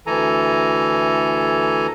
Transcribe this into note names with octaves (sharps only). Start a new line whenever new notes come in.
D2 E3 A4 G#5 A#5